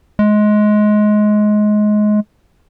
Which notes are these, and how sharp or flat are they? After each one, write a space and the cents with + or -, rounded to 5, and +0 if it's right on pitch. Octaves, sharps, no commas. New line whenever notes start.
G#3 +20